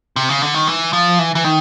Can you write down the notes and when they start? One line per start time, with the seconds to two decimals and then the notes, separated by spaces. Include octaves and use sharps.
0.16 C3
0.29 C#3
0.42 D3
0.54 D#3
0.67 E3
0.93 F3
1.19 E3
1.35 E3
1.44 D#3